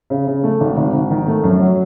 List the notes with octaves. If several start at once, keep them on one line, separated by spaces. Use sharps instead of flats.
C#3
C#3
A3
G#1
G#1
G#1
D#3
A3
F#2
F#3